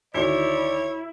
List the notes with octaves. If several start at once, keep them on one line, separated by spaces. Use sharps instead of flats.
D2 D#3 E4 C#5 D5